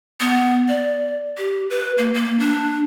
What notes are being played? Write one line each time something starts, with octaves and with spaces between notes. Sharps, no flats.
B3
D5
G4
B4
A#3
A#3
D4